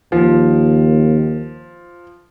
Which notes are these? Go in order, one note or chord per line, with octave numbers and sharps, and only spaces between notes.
D#2 F3